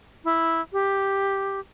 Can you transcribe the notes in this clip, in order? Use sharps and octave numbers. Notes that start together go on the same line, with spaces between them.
E4
G4